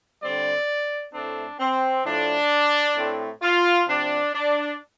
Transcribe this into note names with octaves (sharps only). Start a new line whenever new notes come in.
D3 G3 C4 D5
A2 A3 C4 D4
C4
A2 F3 A3 D4
A2 A3 C4
F4
C3 F3 C4 D4
D4